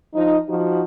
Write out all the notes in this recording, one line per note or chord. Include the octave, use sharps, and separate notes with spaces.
F3 D#4
F3 D#4 F#4